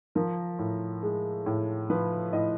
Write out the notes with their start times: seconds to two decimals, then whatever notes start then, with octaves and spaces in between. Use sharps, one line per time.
0.15 F3 A#4
0.59 A2
1.02 G#3
1.46 A2
1.90 F3 B4
2.33 A2 D#5